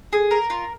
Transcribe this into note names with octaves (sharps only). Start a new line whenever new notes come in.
G#4
A#4
F4